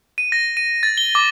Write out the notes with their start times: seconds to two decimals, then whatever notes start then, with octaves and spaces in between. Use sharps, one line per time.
0.18 D#7
0.32 A#6
0.57 D#7
0.83 A6
0.97 G7
1.15 D6